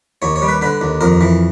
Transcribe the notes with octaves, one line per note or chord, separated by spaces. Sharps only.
D#2 C#5
C#5
G3
B4
D3 B4
D#2
F2 A#4
E3